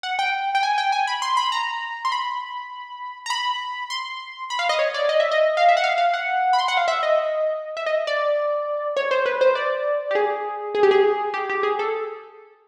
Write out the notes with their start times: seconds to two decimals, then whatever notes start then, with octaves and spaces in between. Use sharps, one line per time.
0.03 F#5
0.19 G5
0.55 G5
0.63 G#5
0.78 G5
0.92 G#5
1.07 B5
1.22 C6
1.37 B5
1.52 A#5
2.05 C6
2.12 B5
3.26 A#5
3.30 B5
3.90 C6
4.50 B5
4.59 F5
4.69 D#5
4.79 C#5
4.94 D5
5.09 D#5
5.20 E5
5.31 D#5
5.57 F5
5.69 E5
5.77 F#5
5.84 F5
5.98 F5
6.14 F#5
6.53 B5
6.58 C6
6.68 F#5
6.77 F5
6.88 E5
7.03 D#5
7.77 E5
7.86 D#5
8.07 D5
8.97 C#5
9.11 C5
9.26 B4
9.41 C5
9.55 D5
10.11 G4
10.15 G#4
10.75 G#4
10.83 G4
10.91 G#4
11.34 G4
11.49 G4
11.63 G#4
11.79 A4